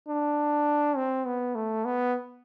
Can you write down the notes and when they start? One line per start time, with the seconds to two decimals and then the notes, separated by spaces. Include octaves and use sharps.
0.08 D4
0.97 C4
1.26 B3
1.55 A3
1.85 B3